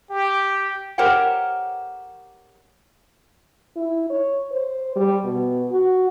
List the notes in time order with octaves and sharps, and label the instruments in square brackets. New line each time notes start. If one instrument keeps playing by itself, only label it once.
[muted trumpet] G4
[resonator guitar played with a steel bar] G4 A#4 C5 C#5 F#5 G5
[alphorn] E4
C#5
C5
G3
B2
F#4